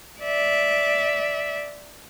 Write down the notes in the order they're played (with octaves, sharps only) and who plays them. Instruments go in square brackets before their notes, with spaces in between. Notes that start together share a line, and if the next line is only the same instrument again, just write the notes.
[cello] D5 E5